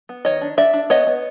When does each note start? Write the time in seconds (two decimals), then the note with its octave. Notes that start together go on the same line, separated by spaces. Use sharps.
0.09 B3
0.25 D#3 C#5 D#5
0.42 D4
0.57 D4 D5 E5
0.73 D4
0.90 B3 C#5 D#5
1.07 B3